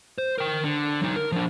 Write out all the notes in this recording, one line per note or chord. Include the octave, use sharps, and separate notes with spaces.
C5
A#4 G5
D3
F#3 D#4
A#4
F3 D4